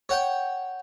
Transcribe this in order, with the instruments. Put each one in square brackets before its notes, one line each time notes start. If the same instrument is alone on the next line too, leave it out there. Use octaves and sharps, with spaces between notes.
[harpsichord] C#5 F#5 G5